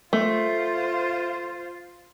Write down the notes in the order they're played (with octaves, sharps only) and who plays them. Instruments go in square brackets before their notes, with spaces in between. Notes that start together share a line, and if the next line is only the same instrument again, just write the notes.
[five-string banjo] A3 [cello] F4 C5